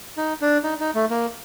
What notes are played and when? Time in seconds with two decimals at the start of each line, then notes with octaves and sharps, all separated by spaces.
0.17 D#4
0.42 D4
0.63 D#4
0.80 D#4
0.95 A3
1.10 A#3